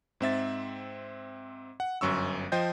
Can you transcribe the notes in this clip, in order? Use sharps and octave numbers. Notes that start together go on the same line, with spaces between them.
G#2 C4 E5 A6
F#5
G1 F#2 C#4 C#6 E6
F3 C5 D#5 G5 G6